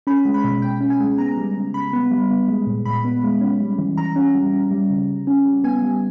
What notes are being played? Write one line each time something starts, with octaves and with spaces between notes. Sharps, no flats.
C#4 B5
G#3
B5
B2
B2 G5
C#4
G#5
G#3
B3 A#5
G3
C#3
C#3 B5
B3
G3
B3
G#3
A#2
A#2 B5
B3
G#3
C#4
G3
E3
E3 A#5
C#4
G3
C#4
G3
C#3
C#3
C#4
G3
B3 G#5
G3